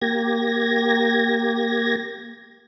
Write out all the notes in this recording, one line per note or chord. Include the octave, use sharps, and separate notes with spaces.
A#3 G4 G#6 A#6